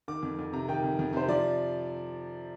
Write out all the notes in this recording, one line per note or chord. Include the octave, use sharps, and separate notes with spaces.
D#3 D6
F2
F2
C3 A#5
D#3 G5
F2
F2
C3 C5
F3 D5